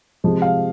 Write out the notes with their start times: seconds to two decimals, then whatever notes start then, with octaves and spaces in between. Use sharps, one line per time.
0.24 C3 F3 G#3
0.42 F5